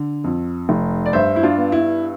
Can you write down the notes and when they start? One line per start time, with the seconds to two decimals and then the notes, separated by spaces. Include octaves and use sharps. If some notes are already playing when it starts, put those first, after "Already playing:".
Already playing: D3
0.24 F2
0.69 F1
1.06 D5
1.13 G2 C5 E5
1.36 E4
1.43 D4 F4
1.57 B3
1.72 E4